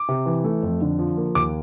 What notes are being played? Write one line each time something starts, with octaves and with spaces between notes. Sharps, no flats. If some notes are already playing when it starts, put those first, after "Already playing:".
Already playing: D6
C3
E3
A3
F2
D3
F3
A#3
D#2 D6